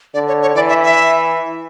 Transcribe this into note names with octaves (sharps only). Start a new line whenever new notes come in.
D3 D5
C#5
C#5
E3 D5
E5
E5